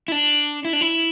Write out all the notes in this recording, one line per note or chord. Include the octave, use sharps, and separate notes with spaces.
E4
D4
E4
D4
E4